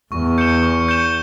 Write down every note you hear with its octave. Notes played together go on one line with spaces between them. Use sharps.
E2 C#6
G6 C#7 E7 G7
C#6
G6 C#7 E7 G7